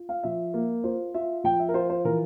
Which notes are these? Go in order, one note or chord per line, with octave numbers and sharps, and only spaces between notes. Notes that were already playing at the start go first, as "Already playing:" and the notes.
Already playing: F4
F5
F3 E5
A#3
F4 C5
F4 E5
F3 G5
E5
A#4
F4 C5
C5
E3 A#4